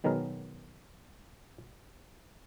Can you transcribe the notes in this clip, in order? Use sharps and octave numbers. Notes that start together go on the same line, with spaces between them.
B2 D#3 F#3 G#3 B3 A#4